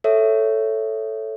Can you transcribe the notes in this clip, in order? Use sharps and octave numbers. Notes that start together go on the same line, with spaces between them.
A4 C#5 E5